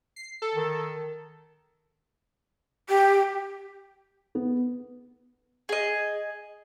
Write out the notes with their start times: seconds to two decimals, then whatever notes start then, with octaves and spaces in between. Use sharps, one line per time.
0.16 C7
0.42 A4
0.55 D#3
2.89 G4
4.35 B3
5.69 G#4 D#5